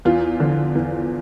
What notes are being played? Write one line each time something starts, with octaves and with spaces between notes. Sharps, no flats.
E2 F4
D3 F3
E2